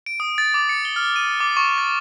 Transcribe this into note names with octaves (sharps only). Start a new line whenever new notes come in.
D7
D#6
A6
D6
C#7
G7
F6
D#7
D6
C#6
A6